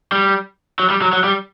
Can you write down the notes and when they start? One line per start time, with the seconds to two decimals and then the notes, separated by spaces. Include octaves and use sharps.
0.12 G3
0.80 F#3
0.90 G3
1.02 F#3
1.13 F#3
1.24 G3